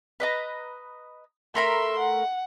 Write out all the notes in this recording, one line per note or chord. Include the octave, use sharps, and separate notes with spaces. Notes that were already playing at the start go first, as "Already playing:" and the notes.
B4 D#5 A#5
A3 A#4 E5 B5 C6
F#5